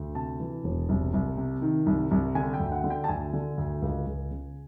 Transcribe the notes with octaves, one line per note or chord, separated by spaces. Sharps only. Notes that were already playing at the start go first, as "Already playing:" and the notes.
Already playing: D2
C3 A5
E3
E1
C2
C2
C3
D#3
C2
C2
D3 G#5
G5
D2
F#5
D3
G5
A5
D2 G#5
D3
D2
C#2
C#2
C#3